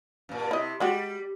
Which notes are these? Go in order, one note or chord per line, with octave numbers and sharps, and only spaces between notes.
G2 A#2
C3 E4 D#5
G3 G#3 F#4 G4